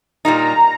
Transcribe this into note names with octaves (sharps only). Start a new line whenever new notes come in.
A#2 G3 A#3 D#4 A#5